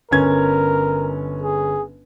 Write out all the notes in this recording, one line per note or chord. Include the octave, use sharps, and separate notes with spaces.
G1 C#4 A#4 G#6
G#4